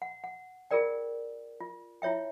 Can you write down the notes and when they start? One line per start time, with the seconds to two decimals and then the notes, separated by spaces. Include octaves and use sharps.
0.02 F#5
0.24 F#5
0.71 F4 G#4 A#4 D5 G5
1.60 F4
2.02 E4 F4 C#5 E5 G5